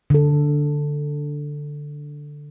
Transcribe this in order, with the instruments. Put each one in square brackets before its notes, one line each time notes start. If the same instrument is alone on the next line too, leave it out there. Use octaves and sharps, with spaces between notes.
[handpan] D3 A4